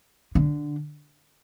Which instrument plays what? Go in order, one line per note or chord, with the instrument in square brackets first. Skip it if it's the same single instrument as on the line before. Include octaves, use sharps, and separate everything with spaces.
[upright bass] D3